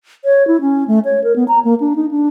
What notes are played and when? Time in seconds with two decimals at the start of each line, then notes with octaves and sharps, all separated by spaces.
0.25 C#5
0.47 E4
0.61 C#4
0.88 A3
1.05 C#5
1.24 A#4
1.36 B3
1.48 A#5
1.65 A#3
1.80 D4
1.96 D#4
2.11 D4